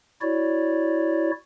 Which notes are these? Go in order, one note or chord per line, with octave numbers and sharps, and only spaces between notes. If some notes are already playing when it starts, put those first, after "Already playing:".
E4 F#4 C#5 D5